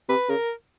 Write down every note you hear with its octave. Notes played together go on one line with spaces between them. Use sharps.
C3 B4
C#3 A#4